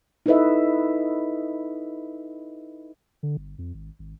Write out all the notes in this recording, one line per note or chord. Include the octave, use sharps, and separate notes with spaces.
D#4 E4 A4 B4 D#5 E5
D3
G1
F2
G#1
G#1